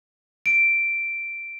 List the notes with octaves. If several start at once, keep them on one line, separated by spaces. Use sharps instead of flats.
D7